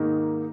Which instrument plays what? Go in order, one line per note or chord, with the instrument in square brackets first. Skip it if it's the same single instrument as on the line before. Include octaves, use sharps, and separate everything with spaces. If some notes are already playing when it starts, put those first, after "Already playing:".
Already playing: [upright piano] G#2 D#3 A#3 D#4